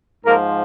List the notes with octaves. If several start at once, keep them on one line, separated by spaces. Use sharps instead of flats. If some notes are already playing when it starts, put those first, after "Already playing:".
G#2 F3 A#3 A#4